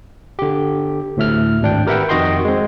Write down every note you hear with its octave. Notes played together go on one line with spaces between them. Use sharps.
D3 G4
D2 A2 E5 F6
G#1 D4 G5
G4 A#4 B4 E5 F#5 G5
F2 D#3 F#4 D#5 G5 C6
G#3 C4